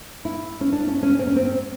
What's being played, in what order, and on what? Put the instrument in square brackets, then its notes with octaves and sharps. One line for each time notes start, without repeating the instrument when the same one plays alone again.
[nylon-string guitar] E4
C#4
D4
C#4
C#4
C4
C#4
C4